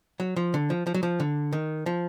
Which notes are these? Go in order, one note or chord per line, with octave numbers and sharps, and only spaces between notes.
F#3
F3
D3
F3
F3
F#3
F3
D3
D#3
F3